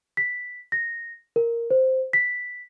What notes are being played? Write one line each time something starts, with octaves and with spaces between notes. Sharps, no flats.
B6
A#6
A#4
C5
B6